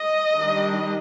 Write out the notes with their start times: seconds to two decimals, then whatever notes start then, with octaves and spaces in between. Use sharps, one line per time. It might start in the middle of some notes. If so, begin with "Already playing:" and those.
Already playing: D#5
0.37 D#3 G3 D4